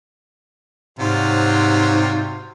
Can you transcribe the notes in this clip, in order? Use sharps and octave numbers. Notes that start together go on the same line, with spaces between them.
G#2 C3 F#3 G3 F4